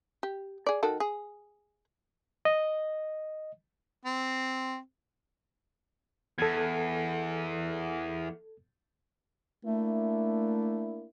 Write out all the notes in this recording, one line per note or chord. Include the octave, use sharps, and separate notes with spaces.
G4
G#4 D5
D#3 F#4 A4
G#4
D#5
C4
E2 A4 G#6
A3 A#3 D4 E4